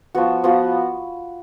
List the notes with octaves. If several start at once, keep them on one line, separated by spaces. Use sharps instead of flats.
F3 B3 F#4
F3 B3 F#4